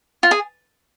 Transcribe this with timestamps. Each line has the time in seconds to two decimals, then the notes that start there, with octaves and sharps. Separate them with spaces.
0.23 F4
0.31 G#4